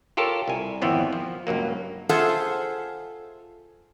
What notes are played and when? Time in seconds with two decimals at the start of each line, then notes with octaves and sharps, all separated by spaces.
0.17 F4 G4 A4 A#4 C#5
0.48 C2 G#5
0.81 G#1 F2 E3 B3 C4 C#5
1.13 F3
1.47 C#2 G2 F#3 A#3
2.09 F4 G#4 A4 C5 E5 F#5